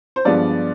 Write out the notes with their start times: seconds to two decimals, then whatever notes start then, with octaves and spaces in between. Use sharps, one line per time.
0.16 C5
0.25 G2 F3 G#3 B3 D5